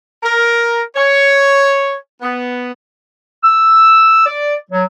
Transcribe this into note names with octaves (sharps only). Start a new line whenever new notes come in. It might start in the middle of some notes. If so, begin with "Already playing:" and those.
A#4
C#5
B3
E6
D5
F#3